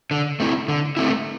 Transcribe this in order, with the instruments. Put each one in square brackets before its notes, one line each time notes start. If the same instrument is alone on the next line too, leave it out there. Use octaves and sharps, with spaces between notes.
[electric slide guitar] D3
A3 C4 E4
D3
A3 C4 E4